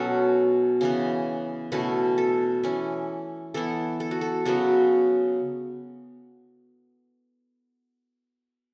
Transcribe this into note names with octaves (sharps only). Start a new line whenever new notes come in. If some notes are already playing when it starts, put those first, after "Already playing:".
Already playing: B2 F#3 C#4 F#4 A4
C#3 E3 B3
B2 A3 C#4 E4 B4
A4
E3 C#4 E4
E3 B3 E4 A4
A4
F#4
A4
C#3 F#3 B3 F#4